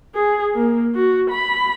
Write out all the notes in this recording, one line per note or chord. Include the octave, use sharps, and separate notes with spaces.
G#4
A#3
F#4
B5